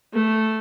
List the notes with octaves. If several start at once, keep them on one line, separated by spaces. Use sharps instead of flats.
A3